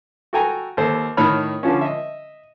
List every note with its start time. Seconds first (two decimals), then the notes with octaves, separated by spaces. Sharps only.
0.33 F#4 A4 G5 G#5 A#5
0.77 D#2 A4 C5
1.17 A2 D#3 C#5 B5 F6
1.63 D3 F3 C#4
1.81 D#5 E5